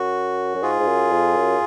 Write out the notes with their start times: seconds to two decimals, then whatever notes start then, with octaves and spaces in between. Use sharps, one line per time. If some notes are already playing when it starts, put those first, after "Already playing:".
Already playing: F#2 F#4
0.55 F#2
0.63 G#2 F4 G#4
0.79 G#2
0.88 F#2
1.12 F2
1.37 F#2